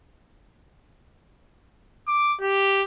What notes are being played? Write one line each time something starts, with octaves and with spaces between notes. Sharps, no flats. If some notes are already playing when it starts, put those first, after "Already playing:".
D6
G4